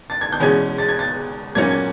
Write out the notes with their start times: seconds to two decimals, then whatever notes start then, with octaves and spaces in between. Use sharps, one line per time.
0.10 A6
0.21 G#6
0.32 G6
0.40 E2 B2 G#3 C#4 G#6
0.78 A6
0.89 G#6
0.99 A6
1.55 A#2 F#3 A#3 C#4 G#6
1.71 G#6